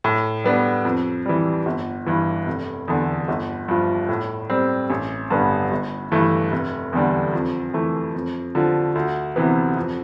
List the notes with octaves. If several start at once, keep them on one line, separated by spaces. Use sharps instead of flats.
A2
G3 B3 D4
F2
E3 G3
G1
G2 E3
F1
E2 D3
G1
G2 F3
A2
G3 C4
A1
G2 D3 G3 B3
G1
G2 E3 A3
F1
E2 D3 G3
F2
E3 A3
F2
D3 F3
D2
C3 E3 B3
F2